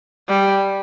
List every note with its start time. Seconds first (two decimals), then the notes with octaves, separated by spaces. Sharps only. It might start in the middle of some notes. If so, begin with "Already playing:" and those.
0.29 G3